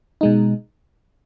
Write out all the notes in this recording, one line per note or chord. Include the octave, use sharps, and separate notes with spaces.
B2 G#3 D#4